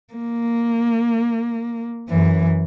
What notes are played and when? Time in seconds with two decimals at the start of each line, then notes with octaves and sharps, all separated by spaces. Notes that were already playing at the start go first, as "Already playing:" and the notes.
0.14 A#3
2.09 F#2 E3